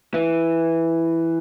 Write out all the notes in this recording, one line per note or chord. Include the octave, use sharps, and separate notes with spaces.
E3